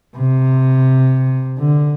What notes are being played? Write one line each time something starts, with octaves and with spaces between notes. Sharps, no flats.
C3
D3